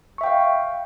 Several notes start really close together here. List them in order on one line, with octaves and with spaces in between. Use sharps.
C#6 E5 G5 F5